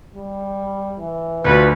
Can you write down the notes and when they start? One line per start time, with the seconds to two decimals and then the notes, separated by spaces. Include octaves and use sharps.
0.15 G3
0.98 E3
1.45 D2 D4 F4 F#4 B4